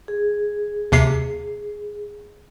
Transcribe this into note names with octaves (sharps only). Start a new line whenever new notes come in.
G#4
D#2 C3 C7